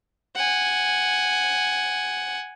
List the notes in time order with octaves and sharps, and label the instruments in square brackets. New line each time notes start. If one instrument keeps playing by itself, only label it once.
[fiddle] F#5 G#5